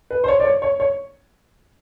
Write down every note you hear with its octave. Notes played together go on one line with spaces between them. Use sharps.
B4
C5
C#5
D5
C#5
C#5
C#5